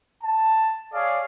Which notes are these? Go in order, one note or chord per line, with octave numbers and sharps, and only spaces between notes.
A5
G#4 C#5 D5 F5